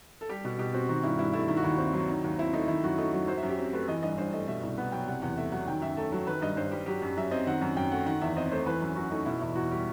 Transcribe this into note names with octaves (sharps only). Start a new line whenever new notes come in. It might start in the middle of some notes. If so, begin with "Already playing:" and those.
A4
G3 G4
B2
B2 G4
C4 F#4
D#3 F#4
G2 E4
G2 E4
A3 E4
D#3 E4
F#4
D#2 E4
C4
F#3
D#3
D#2
C4 E4
A3 D#4
D#3 E4
F#2 F#4
A3 D#4
F#3
F#3 C5
E5
F#2
G4
C4
A3 B4
E3 D#5
G2 D#5
G2 C5
A3 D#5
B2 E5
C2
B3 F#5
F#3 G5
C3 F#5
E2 F#5
A3 E5
F#3 F#5
D#3 G5
F#2 E5
A3 A4
F#3
D#3 B4
G2 D#5
G2 C5
G3 G4
F#3 G4
F#2
F#2 E5
C4 D#5
D#3 F#5
F#2
F#2 G5
A3 F#5
D#3 F#5
E2 E5
C4 D#5
A3 C5
E3 B4
F#2
F#2 F#4
A3 D#4
B2 E4
E2 E4
E2 F#4
G3 G4